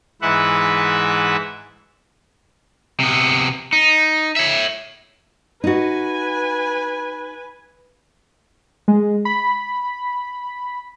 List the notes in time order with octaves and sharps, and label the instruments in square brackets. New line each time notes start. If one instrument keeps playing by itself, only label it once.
[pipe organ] G#2 E3 B4 E5 F#5
[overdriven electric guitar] C3 B3
D#4
C#5 E5
[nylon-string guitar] D#4 F#4 [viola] B4 G#5
[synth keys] G#3
B5